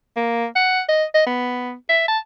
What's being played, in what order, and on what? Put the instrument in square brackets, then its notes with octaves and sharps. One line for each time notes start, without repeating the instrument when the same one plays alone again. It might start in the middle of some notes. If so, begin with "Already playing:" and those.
[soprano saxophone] A#3
F#5
D#5
D#5
B3
E5
A5